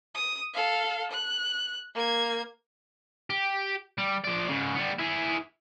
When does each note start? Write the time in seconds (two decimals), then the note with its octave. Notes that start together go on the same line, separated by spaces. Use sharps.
0.14 D#6
0.54 A4 F5
1.11 F#6
1.95 A#3 G#6
3.30 G4
3.98 G3
4.25 F3 D5
4.50 G#2 C#3
4.75 G3 B3
4.99 E4 G#4